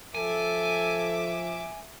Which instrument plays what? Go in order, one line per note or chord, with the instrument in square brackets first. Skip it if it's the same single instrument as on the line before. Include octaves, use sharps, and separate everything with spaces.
[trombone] F3 [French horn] A4 [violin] E5 D6 [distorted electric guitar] G#5